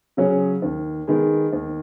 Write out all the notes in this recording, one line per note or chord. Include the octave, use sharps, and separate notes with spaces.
C#3 F#3 C#4 G#4
D#2
D#3 G#3 B3 G#4
D#2